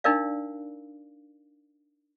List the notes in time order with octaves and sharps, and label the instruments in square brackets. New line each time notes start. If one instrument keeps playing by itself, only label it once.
[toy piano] D4 D#4 A#4 D5 F5